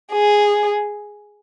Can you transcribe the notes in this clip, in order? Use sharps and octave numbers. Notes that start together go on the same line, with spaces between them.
G#4